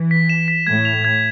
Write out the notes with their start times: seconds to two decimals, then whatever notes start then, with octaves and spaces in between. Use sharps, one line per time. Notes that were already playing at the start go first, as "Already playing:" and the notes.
Already playing: E3
0.11 B6
0.29 E7
0.48 B6
0.67 A2 G#6
0.85 F7
1.05 G#6